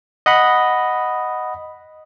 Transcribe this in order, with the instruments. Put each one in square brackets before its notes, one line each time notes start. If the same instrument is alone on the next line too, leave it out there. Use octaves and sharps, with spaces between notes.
[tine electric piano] D#5 F#5 B5